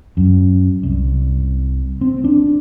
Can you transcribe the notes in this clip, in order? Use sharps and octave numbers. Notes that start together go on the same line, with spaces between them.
F#2
C2
C4
D4